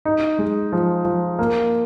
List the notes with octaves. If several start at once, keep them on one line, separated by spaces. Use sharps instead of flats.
D#4
G#3
F3
F3
A#3